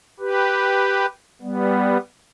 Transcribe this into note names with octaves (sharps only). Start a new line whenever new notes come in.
G4 B4
G3 B3